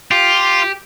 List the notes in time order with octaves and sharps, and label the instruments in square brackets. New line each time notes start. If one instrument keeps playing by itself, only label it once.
[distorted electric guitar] F4 [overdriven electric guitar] G4